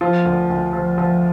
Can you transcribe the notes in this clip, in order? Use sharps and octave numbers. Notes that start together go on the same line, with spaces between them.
F3 F4
D2
D2
F3
F3